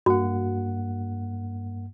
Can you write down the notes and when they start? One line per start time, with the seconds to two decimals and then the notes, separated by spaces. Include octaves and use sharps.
0.06 G2 A#3 F#4 F#5